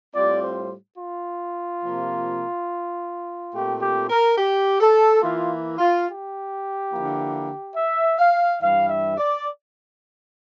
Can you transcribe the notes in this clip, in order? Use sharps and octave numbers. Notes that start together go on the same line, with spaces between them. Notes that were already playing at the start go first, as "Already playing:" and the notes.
A2 G3 C4 F4 D5
C5
F4
C3 F3 A#3
A#2 A3 C4 G4
G4
A#4
G4
A4
E3 A#3 E4 F4
F4
G4
D3 F3 A#3 E4
E5
F5
G2 E3 G3 F5
E5
D5